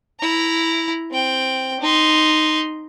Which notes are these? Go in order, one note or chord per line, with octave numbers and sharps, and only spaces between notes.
E4 A#5
C4 G5
D#4 C6